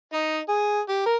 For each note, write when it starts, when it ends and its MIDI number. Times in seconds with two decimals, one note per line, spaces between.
0.13 0.38 63
0.49 0.80 68
0.89 1.04 67
1.06 1.15 70